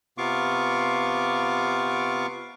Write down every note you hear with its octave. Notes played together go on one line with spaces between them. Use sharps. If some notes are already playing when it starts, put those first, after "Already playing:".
C3 B3 F4 F5 C#6 D6